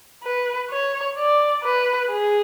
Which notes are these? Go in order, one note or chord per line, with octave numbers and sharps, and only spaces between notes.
B4
C#5
D5
B4
G#4